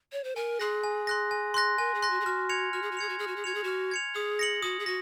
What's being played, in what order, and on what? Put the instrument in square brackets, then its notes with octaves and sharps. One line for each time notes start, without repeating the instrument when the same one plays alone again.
[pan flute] C#5
C5
[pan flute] A#4 [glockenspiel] G#5
[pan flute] G#4 [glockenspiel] C6 F#6 A#6
[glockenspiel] G#5
C6 F#6 A#6
G#5
C6 F#6 A#6
[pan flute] A#4 [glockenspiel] G#5
[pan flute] G#4
[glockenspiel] C6 F#6 A#6
[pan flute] F#4
G#4
[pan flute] F#4 [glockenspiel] F6
[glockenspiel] G#6 C#7 F7
[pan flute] F#4 [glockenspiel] F6
[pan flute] G#4
F#4
[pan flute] G#4 [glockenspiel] G#6 C#7 F7
[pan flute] F#4
[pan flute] G#4 [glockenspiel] F6
[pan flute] F#4
G#4
[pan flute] F#4 [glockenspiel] G#6 C#7 F7
[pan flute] G#4
[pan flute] F#4 [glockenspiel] F6
[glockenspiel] G#6 C#7 F7
[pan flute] G#4 [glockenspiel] D#6
[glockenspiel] A#6 C#7 F#7
[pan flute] F#4 [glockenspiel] D#6
[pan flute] G#4
[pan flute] F#4 [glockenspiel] A#6